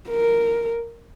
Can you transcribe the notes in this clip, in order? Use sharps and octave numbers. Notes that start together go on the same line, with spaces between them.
A#4